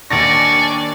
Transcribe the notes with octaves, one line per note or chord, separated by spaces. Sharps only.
D#2 D4 D5 G#5 C#6 A6 A#6